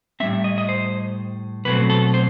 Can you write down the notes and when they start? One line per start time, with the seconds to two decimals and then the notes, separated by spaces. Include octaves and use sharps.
0.20 A2 G3 C4 E5
0.44 D#5
0.58 D#5
0.69 C5
1.65 B2 F#3 A3 C4 B4
1.90 A4
2.14 C5